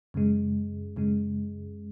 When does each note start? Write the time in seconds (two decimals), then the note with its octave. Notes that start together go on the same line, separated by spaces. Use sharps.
0.14 F#2 C#3 G#3
0.96 F#2 C#3 G#3